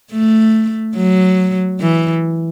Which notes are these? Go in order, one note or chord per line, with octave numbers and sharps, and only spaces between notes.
A3
F#3
E3